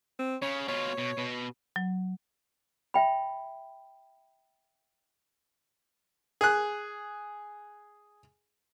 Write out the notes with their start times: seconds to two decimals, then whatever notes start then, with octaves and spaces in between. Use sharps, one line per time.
0.19 C4
0.42 C#3 C#5
0.68 B2 F4 C#5
0.99 B2
1.18 B2
1.76 F#3
2.94 E5 G5 B5
6.41 G#4 F#6